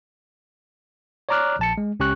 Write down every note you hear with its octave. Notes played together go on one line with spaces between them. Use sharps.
C#5 D5 A#5 D6 F6 F#6
A#1 A5 C#7
G#3
C#2 C#4 G4 C#6 F#6